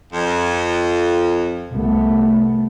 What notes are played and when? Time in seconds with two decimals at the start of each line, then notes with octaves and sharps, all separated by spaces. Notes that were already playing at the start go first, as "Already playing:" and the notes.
0.13 F2
1.73 C2 A3 B3